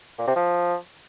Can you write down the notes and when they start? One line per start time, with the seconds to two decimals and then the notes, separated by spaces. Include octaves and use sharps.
0.18 A#2
0.27 C3
0.36 F3